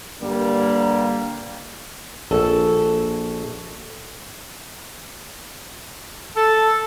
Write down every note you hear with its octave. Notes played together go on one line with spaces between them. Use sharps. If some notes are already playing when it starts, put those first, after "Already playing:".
G2 D3 G3 A#3
A#1 F#4 A4
A4